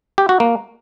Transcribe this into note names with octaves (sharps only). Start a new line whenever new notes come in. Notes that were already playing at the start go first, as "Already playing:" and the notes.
G4
F#4
A#3